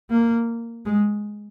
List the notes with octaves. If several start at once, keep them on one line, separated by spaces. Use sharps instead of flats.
A#3
G#3